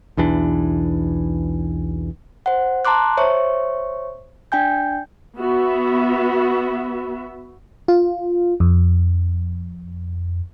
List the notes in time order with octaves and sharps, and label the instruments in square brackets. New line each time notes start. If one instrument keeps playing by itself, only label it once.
[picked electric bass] B1 E2 E3 D4
[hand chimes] C5 F#5
A5 A#5 C6 D6 F#6
C5 C#5 E5 C#6
D4 G5 G#5 G6
[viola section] B3 F#4 E5
[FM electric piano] F4
F2